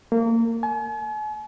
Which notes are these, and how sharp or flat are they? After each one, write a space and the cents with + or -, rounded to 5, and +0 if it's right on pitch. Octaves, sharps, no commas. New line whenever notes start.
A#3 -30
G#5 +45